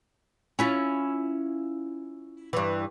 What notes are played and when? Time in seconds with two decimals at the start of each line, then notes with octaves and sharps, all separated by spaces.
0.59 C#4 E4 F4
2.53 G2 E3